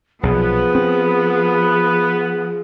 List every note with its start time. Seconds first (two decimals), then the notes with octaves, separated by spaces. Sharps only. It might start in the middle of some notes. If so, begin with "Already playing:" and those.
0.23 B1 A#2 F3 B3 G#4
0.75 C4